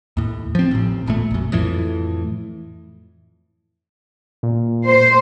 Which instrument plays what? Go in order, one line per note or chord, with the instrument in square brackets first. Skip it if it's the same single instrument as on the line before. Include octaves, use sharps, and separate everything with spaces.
[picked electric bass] D#2 A2
F3 C4
A1 A2
D1 G#1 A#2 A3
B1 F#2
F2 A2 E3
[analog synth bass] A#2
[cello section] C5